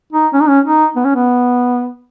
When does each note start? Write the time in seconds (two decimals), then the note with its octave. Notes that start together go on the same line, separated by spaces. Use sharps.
0.13 D#4
0.34 C#4
0.41 D#4
0.49 C#4
0.65 D#4
0.96 B3
1.05 C#4
1.15 B3